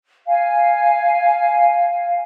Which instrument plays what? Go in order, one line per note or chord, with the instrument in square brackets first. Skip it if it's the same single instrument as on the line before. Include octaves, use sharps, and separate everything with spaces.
[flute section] F5 G#5